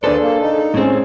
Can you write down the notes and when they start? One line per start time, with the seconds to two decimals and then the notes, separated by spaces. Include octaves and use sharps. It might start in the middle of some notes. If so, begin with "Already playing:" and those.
0.04 D#2 D4 G#4 A4 B4 C5 D5
0.21 A#3
0.41 D#4
0.74 A2 G#3 C4 C#4 G#4